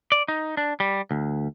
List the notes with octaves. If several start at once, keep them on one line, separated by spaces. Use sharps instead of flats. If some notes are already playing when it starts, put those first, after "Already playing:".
D5
D#4
D4
G3
D2